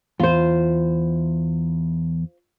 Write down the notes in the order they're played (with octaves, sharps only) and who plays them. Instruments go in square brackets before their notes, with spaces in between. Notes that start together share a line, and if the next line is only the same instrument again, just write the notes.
[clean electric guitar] E2 [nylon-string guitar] F4 C5